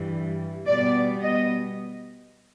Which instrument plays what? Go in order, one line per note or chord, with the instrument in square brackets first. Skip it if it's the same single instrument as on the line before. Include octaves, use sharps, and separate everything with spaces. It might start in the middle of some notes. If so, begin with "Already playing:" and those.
Already playing: [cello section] G2 E3 G3
B2 G3 B3 D5
D#5